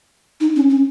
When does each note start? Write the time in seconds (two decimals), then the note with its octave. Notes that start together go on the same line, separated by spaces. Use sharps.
0.41 D#4
0.56 C#4
0.70 C#4